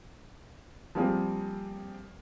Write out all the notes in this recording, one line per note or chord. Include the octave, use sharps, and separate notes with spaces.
F3 G3 A#3 C4 G#4